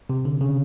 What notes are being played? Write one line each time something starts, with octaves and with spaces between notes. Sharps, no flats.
C3
D3
C#3